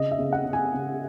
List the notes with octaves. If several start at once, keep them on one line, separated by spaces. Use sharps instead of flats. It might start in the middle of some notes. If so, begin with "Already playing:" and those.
Already playing: C#3 D#5
E5
C#3
F#5
C#3
G#5
C#3